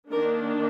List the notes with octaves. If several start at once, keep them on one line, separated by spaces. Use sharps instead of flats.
D#3 A#3 D4 A#4